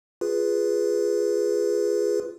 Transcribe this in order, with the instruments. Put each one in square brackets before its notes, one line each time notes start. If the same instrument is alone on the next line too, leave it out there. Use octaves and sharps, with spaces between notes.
[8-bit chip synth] F4 G#4 B4